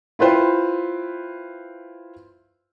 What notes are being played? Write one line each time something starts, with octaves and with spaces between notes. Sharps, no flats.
E4 F4 B4 C5 G5